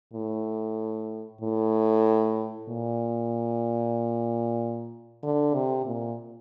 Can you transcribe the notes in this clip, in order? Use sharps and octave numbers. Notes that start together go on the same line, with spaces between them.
A2
A2
A#2
D3
C3
A#2